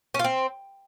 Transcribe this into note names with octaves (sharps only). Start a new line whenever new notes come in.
C#4
F4
C4